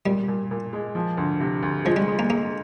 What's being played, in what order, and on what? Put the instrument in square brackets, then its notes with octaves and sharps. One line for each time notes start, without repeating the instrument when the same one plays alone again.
[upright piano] A#2 [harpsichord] G3
[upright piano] A#2
A#2
G#3
F3
D2
C3
D2
[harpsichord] F3 [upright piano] G#3
[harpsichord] G3
[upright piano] G#3
[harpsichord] A#3
[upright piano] G#3 [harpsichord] A#3